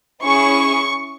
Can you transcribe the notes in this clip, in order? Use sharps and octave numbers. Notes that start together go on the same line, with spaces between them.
C#4 E4 G#4 C#6